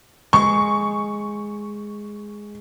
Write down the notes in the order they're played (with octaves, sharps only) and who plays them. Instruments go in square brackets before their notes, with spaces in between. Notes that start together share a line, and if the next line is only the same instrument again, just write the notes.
[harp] G#3 [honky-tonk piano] C#6